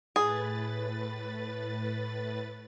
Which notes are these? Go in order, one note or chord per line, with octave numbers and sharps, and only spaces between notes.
A2 G#4 B4 A6